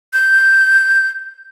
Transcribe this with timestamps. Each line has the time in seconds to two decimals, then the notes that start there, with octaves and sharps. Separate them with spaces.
0.13 G6